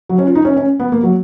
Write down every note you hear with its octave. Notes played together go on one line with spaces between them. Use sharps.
F#3
C#4
F4
D#4
C#4
C#4
B3
A#3
F#3